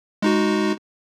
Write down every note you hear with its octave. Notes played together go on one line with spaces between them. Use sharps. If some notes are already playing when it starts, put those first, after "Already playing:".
G#3 D#4 F#4